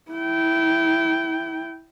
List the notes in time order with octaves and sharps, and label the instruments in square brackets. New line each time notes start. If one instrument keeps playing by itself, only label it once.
[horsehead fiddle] E4 G5